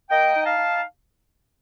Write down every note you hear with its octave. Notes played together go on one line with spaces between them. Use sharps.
A#3 D#5 G5
D#4
F5 A5
D#4